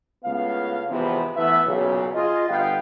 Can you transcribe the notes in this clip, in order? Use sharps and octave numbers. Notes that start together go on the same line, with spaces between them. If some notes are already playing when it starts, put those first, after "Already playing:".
C#2 A2 B3 F5
E2 G#2 C3 F3 B3 E4
E3 A3 B3 E5
B1 A#2 C#3
F4 G#4 D#5
G1 B3 F5 G5